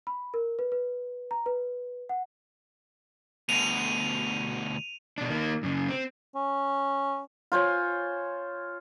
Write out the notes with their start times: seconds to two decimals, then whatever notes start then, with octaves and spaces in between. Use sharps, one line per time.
0.07 B5
0.34 A#4
0.59 B4
0.72 B4
1.31 A#5
1.46 B4
2.09 F#5
3.49 D2 B2 D#7 F7
5.18 B2 D4
5.29 D#3 A#3
5.63 F#2 C#3
5.89 C4
6.35 C#4
7.52 F4 C5 C#5 G#5